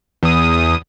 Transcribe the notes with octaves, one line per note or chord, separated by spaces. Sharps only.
E2 D#6